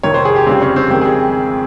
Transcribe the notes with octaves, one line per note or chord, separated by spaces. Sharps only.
F2 C3 D#3 C#5
C5
G#4
G4
G1 F2 C#3 G3 C4
C#4
C4
F2 D#3 G#3 C4
G#4